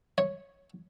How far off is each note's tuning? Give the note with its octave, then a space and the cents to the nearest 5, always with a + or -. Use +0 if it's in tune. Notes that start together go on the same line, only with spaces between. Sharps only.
C#5 -5